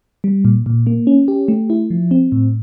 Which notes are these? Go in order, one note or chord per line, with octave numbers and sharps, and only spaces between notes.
G3
A#2
A#2
A#3
C#4
G4
A3
E4
F3
C4
A2